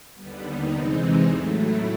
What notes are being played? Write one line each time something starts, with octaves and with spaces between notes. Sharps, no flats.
D#2 D3 G3 B3
D#4
E2 C3 E3 G#3 C4
A2 F#3 A3
E4